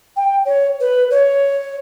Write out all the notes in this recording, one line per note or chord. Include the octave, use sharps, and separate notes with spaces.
G5
C#5
B4
C#5